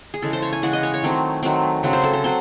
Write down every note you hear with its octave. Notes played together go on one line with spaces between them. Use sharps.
G#4
C#3 E3 G#3 A4
C5
C#5
G#5
C#3 E3 G#3 F#5
D#5
C#5
C#5
D#3 F#3 A3 C4
D#3 F#3 A3 C4
C#3 F#3 C4
C5
A4
C5
F#3 C4 C5